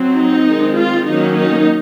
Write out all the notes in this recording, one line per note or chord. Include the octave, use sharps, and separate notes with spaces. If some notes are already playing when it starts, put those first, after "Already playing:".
Already playing: F#3 C4
D#4
D#3 G#3 C4
F4
D#3 F#3 A#3 C#4 D#4
D#4